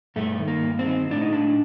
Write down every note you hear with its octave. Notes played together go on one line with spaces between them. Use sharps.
G2 A3
D#3
A#3
G2
C4
D#3
A2 D4
D#4
A2 D4